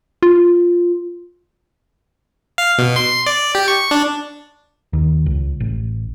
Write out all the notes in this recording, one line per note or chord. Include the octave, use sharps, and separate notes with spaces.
F4
F5
B2
C6
D5
G4
C#6
D4
D#2
C#2
A1